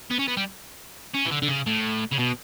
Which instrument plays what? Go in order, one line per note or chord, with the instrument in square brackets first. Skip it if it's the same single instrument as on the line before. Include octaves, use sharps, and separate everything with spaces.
[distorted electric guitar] B3
C#4
B3
G3
C#4
E3
D3
D3
C#3
A2
C#3
B2